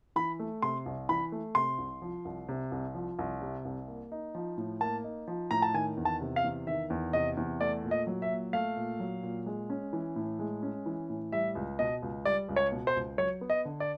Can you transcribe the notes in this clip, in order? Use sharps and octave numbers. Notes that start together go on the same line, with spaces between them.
E3 B5
A3
C3 C6
C2
E3 B5
A3
C3 C6
C2
F3
C2
C3
C2
F3
C2
C3
C2
A#3
D#4
F3
A2
A#3 A5
D#4
F3
A2 A#5
A5
D#3 G#5
E2
A5
C3
F5
E2
D#3 E5
E2
C3 D#5
E2
A3 D5
A#2
D#5
F#3
E5
A#2
A3 F5
A#2
F#3
A#2
G#3
C#4
E3
A2
G#3
C#4
E3
A2
G3 E5
C#2
B2 D#5
C#2
G3 D5
C#2
C#5
B2
C5
C#2
F#3 C#5
B3
D#5
D3
D5